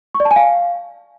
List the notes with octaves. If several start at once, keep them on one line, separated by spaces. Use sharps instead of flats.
C#6
D5
A5
G#5
F5